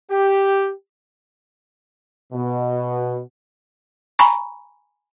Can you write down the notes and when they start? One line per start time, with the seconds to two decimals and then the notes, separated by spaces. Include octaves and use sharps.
0.11 G4
2.32 B2
4.19 G#5 A#5 B5 C#6